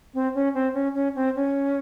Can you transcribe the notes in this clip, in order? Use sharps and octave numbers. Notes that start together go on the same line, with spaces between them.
C4
C#4
C4
C#4
C#4
C4
C#4